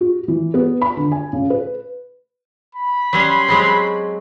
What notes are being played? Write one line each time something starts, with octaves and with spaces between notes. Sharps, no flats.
F#4
E3
B3
B5
D3
G#5
C#3
B4
B5
F#3 G3 C#4 C6
F#3 G#3 C4